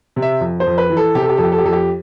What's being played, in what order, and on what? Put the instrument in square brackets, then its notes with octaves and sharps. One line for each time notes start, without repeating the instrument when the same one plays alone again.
[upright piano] C3
E5
F2
C5
F2
B4
E3
A4
C3 G4
A4
G4
F2 A4
G4
A4
G4
F2 A4
G4